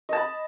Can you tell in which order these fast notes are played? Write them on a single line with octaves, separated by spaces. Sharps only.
D#5 A5 B5